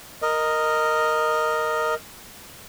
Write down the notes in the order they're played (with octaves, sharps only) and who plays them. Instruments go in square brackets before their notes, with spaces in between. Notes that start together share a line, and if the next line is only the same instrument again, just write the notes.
[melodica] A#4 D#5